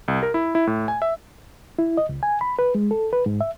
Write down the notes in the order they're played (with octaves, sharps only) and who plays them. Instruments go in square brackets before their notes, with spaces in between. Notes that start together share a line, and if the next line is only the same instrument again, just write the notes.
[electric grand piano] C2
A#4
E4
E4
A2
G#5
E5
[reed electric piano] E4
D#5
C#2
G#5
B5
B4
G#3
A4
B4
G#2
E5